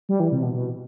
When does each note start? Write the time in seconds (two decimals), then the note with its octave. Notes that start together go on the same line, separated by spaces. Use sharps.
0.09 G3
0.20 E3
0.32 C3
0.42 B2
0.54 B2